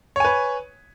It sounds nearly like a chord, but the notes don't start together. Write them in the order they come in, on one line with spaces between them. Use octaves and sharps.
C#5 G#5 B4